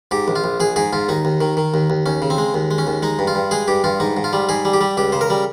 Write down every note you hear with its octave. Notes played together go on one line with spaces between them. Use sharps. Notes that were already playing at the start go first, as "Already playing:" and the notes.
G#2 G4
A#1
F4
A#1
A#1 G#4
G#2 G#4
G#2 F4
D#2 D#4
D#2
D#3
D#3
D#2
D#2
D#2 C#4
C#3
C4
G#3
D#2
G#3
C#4
D#2
G#3 D#4
G2
F4
G2
G#3 G#4
G2 G4
G2 F4
G#2 D#4
G#2
F4
G3
G#2 G#4
G3
G4
G3
C#2 G4
C#3 C5
A#4
G3